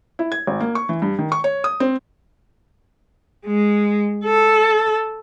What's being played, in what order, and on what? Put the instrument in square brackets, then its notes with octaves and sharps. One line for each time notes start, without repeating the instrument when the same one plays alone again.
[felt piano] E4
G#6
G#1
A#3
C#6
E3
G2
D#3
C#6
C#5
D#6
C4
[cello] G#3
A4